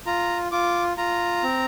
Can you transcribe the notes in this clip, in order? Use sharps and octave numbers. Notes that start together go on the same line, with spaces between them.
F4 A#5
F4 D6
F4 A#5
C4